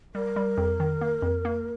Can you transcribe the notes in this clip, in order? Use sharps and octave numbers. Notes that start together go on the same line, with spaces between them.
G3 A#4
G3
F2
D#3
A#3
F2
A#3